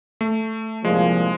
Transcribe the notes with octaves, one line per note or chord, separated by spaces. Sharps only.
A3
C2 A#2 F3 G#3